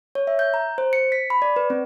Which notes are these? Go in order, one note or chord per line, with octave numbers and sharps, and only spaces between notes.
C#5
E5
G6
A#5
C5
C#7
B6
B5
D5
B4
C4